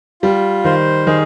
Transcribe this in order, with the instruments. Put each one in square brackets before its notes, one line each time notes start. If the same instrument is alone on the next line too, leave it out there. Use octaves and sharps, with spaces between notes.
[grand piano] G3 [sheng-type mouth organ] F4
[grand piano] D#3 [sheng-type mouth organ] C5
[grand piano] D#3 [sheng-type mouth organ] G#4